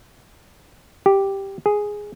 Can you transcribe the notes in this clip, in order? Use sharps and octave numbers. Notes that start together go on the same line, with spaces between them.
G4
G#4